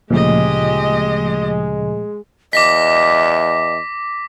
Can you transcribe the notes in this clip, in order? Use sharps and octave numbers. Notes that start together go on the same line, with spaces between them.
D2 A#2 C#3 F3 G#3 A3 G4 D#5
E2 D#5 D6 A#6 B6